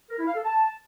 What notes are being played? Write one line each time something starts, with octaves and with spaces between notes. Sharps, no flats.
A#4
E4
F5
A4
A5